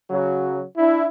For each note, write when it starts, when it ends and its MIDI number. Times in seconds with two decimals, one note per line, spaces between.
0.10 0.62 49
0.10 0.62 54
0.77 1.07 62
0.77 1.07 64